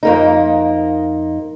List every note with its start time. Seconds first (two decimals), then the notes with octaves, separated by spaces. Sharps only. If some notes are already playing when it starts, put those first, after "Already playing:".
0.03 F2 A#3 D#4